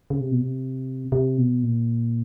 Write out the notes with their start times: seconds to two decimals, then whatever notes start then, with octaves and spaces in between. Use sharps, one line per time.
0.10 C#3
0.21 C3
0.31 B2
0.41 C3
1.12 C3
1.38 B2
1.63 A#2